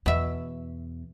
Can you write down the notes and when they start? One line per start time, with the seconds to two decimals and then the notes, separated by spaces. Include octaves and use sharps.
0.06 E2 B2 E5